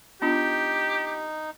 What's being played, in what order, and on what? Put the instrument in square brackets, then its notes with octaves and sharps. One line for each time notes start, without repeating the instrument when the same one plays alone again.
[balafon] B3 D4 F4 [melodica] D#4 [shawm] G4